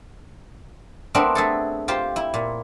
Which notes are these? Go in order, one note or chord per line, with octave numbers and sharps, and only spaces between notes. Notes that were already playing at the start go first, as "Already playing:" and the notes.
A3 B3 C4 D4 A#4
A3 G#4 A4
F4 G4 C5
E4
A#2